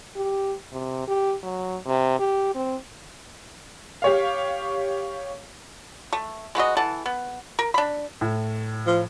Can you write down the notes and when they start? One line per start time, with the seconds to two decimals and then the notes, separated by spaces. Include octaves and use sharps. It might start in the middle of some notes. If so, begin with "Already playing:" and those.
0.16 G4
0.73 C3
1.07 G4
1.43 F#3
1.86 C3
2.19 G4
2.55 C4
4.02 G4 C#5 F5
6.13 A3
6.55 G#3 B3 F#4 D#5
6.77 E3 A4 F#5 A5
7.06 B3
7.59 A#4
7.74 D4 B5
8.21 A2
8.86 F3